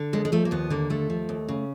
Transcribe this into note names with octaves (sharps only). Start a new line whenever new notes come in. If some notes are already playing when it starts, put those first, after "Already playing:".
Already playing: D3
D#2 G#3
G#3
F3 A3
A#3
D#2 B3
D3 A#3
D#2 A3
F3
D#2
C#3